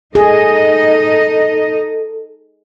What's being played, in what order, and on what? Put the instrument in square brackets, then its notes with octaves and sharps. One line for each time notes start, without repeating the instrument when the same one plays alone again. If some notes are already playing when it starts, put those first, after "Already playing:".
[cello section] D#4 D#5 [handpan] G#4 [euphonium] A4